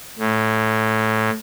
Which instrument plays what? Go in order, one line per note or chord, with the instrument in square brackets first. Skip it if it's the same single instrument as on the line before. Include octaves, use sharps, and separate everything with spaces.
[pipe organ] A2